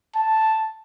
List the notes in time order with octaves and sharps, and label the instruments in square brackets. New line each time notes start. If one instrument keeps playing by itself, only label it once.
[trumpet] A5